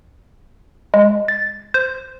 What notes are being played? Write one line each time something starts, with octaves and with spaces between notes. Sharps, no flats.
G#3
A6
C5